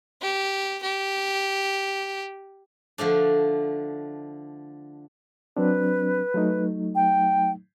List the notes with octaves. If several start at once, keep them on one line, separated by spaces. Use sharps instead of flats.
G4
G4
D3 F3 A3 D4
F#3 C4 D4 B4
F#3 A3 D#4
G5